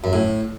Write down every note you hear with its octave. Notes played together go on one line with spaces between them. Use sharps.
F#2
A2